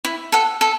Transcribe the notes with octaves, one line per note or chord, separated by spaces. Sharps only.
E4
A4 F#5
A4